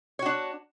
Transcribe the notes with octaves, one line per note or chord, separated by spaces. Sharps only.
D4 F#4 C#5